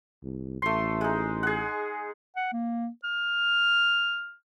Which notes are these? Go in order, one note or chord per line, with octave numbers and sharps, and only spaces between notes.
C2
A1 A3 C6
G#3 D#4
G#4 F#5
F#5
A#3
F6